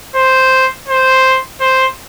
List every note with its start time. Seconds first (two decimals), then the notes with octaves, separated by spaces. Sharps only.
0.15 C5
0.88 C5
1.60 C5